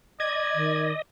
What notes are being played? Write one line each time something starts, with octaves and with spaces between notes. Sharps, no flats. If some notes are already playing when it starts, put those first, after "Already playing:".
D5 D#5 G#6
D#3